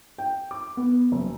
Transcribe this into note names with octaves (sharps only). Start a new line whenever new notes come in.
G5
D6
B3
F#1